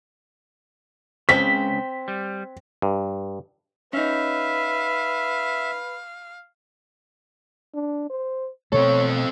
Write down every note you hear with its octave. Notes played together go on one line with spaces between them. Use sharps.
C#2 C#3 C4 B6
G3
G2
C#4 D#4 B4 E5 F5
D4
C5
B2 A3 C4 A4 C#5